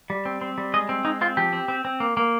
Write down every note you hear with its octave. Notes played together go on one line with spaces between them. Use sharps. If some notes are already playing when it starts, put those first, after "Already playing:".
G3
C4
C4
G3
G#3 D#5
C4
G#3 D#4
C4 F4
F3 G4
C4
C4
C4
A#3
A#3